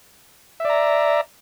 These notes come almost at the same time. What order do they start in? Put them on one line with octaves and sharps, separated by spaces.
E5 D5 A#5